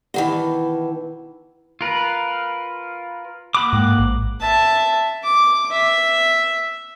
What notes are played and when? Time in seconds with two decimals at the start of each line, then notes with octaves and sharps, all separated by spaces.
0.14 B2 D#3 E3
1.81 F4 A#4 B4
3.55 A#3 F#5 B5 D6 D#6
3.73 G#2
3.98 A1
4.41 E5 A5
5.24 D6
5.71 E5